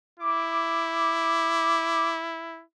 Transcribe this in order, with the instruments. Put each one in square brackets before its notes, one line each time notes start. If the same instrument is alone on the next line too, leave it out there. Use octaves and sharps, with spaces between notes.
[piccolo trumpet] E4 [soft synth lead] D6